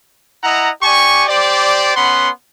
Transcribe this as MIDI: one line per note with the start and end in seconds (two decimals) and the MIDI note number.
0.44 0.70 64
0.44 0.70 75
0.44 0.70 78
0.44 0.70 82
0.83 1.25 67
0.83 1.25 74
0.83 1.25 80
0.83 1.25 85
1.28 1.96 67
1.28 1.96 72
1.28 1.96 74
1.97 2.29 59
1.97 2.29 61
1.97 2.29 78
1.97 2.29 83
1.97 2.29 84